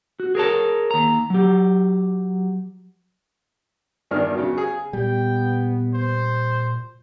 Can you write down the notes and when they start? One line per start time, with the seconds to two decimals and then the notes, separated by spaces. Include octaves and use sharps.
0.20 F#4
0.35 G#4 A#4 C#5 A5
0.91 D#2 A#5
1.30 F#3 G4
4.11 E2 G2 D#3 D4 F6
4.34 C#3 F#3
4.57 G#4
4.93 A#2 G3 B3 G5
5.94 C5